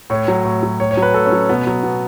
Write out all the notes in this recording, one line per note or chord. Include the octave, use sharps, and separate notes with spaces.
A2 C#5
F#3
A2
F#3
A2 C#5
C#5
F#3
B4
A2 A4
C#4
F#3
B2 B3
F#3
B2